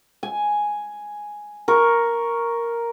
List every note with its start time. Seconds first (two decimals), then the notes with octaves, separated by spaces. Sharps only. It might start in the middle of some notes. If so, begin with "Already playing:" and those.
0.23 G#5
1.68 A#4 C#6